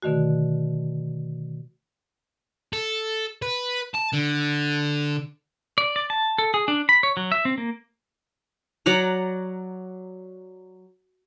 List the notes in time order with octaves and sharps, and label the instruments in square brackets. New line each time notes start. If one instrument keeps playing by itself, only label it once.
[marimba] B2 D3 D#3 A3 F#4
[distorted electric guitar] A4
B4
A5
D3
[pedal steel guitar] D5
D5
A5
A4
G#4
D4
B5
C#5
F#3
E5
C4
A#3
[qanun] F#3 D5 F#5 A#5